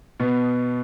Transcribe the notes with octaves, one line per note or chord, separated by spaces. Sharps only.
B2 B3